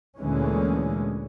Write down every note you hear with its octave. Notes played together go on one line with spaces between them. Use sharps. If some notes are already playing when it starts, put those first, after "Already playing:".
D2 A#2 D3 E3 G#3 C#4